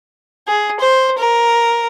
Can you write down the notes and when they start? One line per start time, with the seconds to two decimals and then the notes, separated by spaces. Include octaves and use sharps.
0.47 G#4
0.80 C5
1.18 A#4